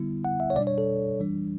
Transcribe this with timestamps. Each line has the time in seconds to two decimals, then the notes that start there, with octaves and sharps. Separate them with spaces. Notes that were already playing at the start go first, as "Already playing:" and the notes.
Already playing: D3 G3 B3 E4
0.25 F#5
0.40 E5
0.50 C#5
0.56 B2 G3 D4 D5
0.67 C#5
0.78 A4
1.20 E3 G3 D4